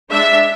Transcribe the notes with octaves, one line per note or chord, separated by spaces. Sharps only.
G#3 D4 E5